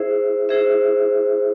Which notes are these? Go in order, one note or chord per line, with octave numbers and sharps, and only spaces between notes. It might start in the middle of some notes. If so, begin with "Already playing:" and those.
Already playing: E4 G#4 C5 E5
E4 G#4 C5 E5